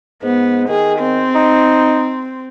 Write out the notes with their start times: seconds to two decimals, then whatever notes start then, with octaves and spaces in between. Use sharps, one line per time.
0.23 G#2 B3
0.69 D#3 G#4
0.99 C4
1.35 D#4